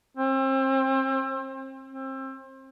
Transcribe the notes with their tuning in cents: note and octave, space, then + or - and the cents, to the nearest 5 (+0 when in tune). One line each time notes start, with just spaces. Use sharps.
C4 +35
C4 +30